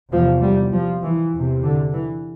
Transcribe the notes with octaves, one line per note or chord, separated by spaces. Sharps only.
E2 C3 F3
G3
F3
E3
E2 C3
D3
E3